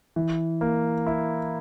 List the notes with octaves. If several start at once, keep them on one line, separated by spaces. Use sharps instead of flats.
E3
A#3
E4